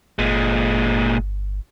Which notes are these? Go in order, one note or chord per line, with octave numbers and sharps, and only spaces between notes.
G1 A#2 G#3